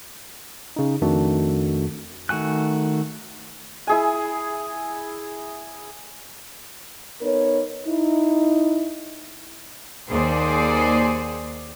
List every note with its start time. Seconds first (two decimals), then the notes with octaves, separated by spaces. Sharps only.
0.76 C#3 D#4
1.01 F2 D#3 A3 D4 F#4 A4
2.29 D#3 A3 F#4 G#5 F#6
3.87 E4 G#4 G#5
7.22 B3 D#4 A#4 B4 C#5
7.87 D#4 E4
10.09 D#2 G#4 C5 D5